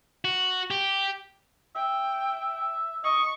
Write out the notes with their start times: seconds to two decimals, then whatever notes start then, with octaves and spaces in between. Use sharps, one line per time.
0.25 F#4
0.71 G4
1.76 E5 G5
3.04 D#5 C#6